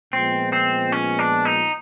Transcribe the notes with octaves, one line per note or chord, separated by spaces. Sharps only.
A#2 F3 G#3 B3 C4
C4
C#4
D4
D#4